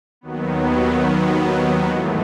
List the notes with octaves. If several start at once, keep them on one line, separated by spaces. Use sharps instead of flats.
D#2 D#3 F#3 B3
G#2 E3 A3